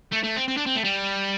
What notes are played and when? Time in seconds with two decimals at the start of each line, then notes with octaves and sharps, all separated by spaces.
0.12 A3
0.24 A3
0.36 C4
0.48 C4
0.57 D4
0.66 C4
0.75 A3
0.84 G3